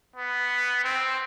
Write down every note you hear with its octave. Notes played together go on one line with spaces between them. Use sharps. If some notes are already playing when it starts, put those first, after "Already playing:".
B3
C4